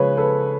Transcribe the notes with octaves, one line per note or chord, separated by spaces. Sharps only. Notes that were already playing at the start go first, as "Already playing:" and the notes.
Already playing: C#3 F3 G#3 B4 C#5
A4 B4